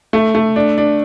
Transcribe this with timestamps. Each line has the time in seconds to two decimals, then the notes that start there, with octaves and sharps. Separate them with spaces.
0.13 A3
0.35 A3
0.56 D4
0.78 D4